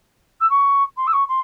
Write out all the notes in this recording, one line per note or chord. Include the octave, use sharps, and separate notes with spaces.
E6
C#6
C6
E6
C#6
C6